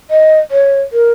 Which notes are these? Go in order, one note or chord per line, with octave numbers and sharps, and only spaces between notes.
D#5
C#5
A#4